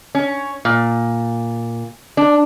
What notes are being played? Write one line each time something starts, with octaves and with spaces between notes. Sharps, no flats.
C#4
A#2
D4